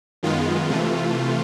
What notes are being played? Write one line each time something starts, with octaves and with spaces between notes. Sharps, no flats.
F#2 D#3 G#3 B3 F4
C3 E3 A3